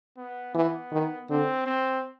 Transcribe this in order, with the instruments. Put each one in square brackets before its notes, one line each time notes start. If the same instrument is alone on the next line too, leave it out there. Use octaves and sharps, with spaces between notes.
[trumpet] B3
[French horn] E3 [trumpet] B3
[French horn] D#3
[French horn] D3 [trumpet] C4
[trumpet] C4